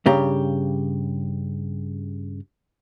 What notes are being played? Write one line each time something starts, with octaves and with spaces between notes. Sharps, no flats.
G2 C#3 G4 A#5